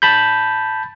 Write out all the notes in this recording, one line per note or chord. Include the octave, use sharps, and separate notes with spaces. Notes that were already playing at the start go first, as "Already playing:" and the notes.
A5 B5 G6